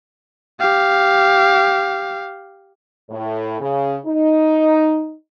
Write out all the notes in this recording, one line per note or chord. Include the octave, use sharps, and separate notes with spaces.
G4 F5
A2
C#3
D#4